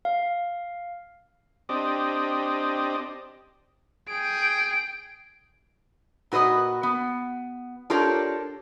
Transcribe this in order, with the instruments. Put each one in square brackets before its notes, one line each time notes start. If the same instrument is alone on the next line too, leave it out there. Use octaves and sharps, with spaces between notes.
[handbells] F5
[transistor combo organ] C4 D4 G4 D#5
[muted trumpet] G#4 [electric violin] G5 D7
[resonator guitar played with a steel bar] A#2 F#4 B4 C5 D#5
B3
D4 F4 G4 A4 A#4 C#5